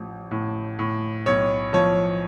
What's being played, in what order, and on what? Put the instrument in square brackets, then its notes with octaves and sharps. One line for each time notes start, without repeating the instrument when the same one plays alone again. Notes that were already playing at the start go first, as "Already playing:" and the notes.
Already playing: [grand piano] A1 F3
A2
A2
B1 C#5
F3 C#5